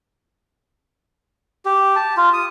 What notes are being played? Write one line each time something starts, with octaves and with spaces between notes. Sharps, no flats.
G4
A5
F4
D#6